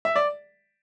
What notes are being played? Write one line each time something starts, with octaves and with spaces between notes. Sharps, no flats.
E5
D5